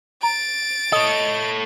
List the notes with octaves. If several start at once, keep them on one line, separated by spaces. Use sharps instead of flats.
A#5 A6 D7
A4 C#5 D#5